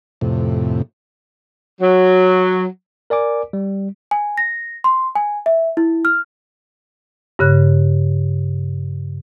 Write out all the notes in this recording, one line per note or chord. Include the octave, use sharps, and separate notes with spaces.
F2 A2 C3
F#3
A#4 D5 G#5 D6
G3
G#5
A#6
C6
G#5
E5
E4
F6
G2 C#3 F#6